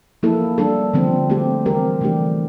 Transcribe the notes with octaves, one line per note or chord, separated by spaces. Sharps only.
F3 A#3 E4 A4
G3 D4 A4
D3 F3 C4
A3 C4 G4
E3 G3 C4 G4 A#4
C3 E3 A3 D4 G4